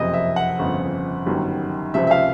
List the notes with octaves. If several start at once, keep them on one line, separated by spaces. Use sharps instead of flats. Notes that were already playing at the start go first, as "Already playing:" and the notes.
Already playing: F#1 F2 C3 D#5
E5
F#5
G1 F2 C#3
G1 F#2 D#3 G3
C#2 C3 F3 E5
E5
F5